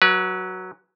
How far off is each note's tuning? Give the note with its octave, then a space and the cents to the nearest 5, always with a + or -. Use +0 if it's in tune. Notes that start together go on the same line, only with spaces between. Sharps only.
F#3 +0 B4 -30